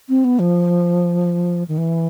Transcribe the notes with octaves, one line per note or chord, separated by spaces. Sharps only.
C4
B3
F3
D#3
E3